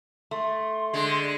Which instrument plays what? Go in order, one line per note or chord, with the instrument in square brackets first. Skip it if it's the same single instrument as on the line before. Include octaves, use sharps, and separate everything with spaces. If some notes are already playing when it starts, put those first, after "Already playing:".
[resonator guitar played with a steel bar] A3 [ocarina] C6
[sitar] D3 G#3